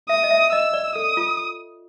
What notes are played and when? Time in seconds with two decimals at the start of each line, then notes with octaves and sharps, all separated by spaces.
0.09 E5 D#6
0.24 D#5
0.31 E5
0.52 D#5 E6
0.74 D5
0.95 A4 D#6
1.17 F4